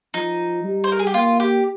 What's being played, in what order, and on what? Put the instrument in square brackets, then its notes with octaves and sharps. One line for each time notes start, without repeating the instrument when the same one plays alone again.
[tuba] F3 [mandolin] D#4
[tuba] G3
[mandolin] C5
A#4
G#4
G4
[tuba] A#3 [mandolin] F4
[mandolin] G4